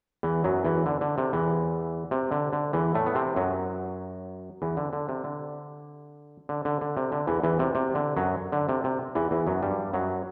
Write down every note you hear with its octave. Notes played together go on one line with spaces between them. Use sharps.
E2 E3
F#2 F#3
E2 E3
D3
D3
C3
E2 E3
C3
D3
D3
E2 E3
A2 A3
B3
C3 C4
F#2 F#3
E2 E3
D3
D3
C3
D3
D3
D3
D3
C3
D3
E2 E3
E2 E3
C3
C3
D3
F#2 F#3
D3
C3
C3
E2 E3
E2 E3
F#2 F#3
G2 G3
F#2 F#3